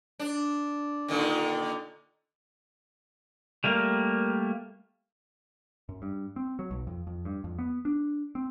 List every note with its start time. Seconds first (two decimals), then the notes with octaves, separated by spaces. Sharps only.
0.20 D4
1.08 A#2 D3 D#3
3.64 G3 A3 A#3 A#4
5.89 F#2
6.02 G2
6.36 C4
6.59 F#3
6.71 B1
6.87 F2
7.07 F2
7.25 G2
7.44 F2
7.59 B3
7.85 D4
8.35 C4